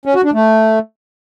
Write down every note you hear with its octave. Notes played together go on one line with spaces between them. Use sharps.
C#4
F#4
D4
A3